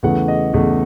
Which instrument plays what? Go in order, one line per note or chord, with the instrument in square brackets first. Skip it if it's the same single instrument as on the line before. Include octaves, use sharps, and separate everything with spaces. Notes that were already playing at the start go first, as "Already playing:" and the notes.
[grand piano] E2 C#3 E3 A3 F#5
D#5
E2 C#3 E3 A3